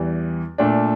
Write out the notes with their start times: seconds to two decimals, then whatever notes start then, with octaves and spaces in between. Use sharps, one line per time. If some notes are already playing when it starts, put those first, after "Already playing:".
Already playing: E2 E3 G3
0.58 A#2 A3 D4